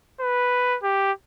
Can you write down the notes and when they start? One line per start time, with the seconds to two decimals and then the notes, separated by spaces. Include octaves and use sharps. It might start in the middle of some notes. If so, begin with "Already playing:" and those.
0.20 B4
0.83 G4